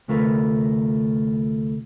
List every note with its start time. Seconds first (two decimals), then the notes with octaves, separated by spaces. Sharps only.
0.08 D2 C3 A3 F4 A#4 B4